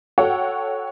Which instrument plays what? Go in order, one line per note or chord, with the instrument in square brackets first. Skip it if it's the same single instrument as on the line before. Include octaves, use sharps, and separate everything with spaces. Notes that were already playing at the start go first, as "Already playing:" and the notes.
[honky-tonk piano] F#4 A4 C#5 F#5 G5